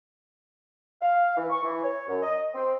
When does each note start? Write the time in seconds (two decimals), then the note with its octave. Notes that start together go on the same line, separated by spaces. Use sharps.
1.00 F5
1.36 E3
1.50 C#6
1.63 E3
1.82 C#5
2.07 F#2
2.22 D#5
2.54 C4